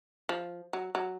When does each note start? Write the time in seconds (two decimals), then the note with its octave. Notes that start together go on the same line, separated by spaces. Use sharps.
0.29 F3
0.73 F#3
0.95 F#3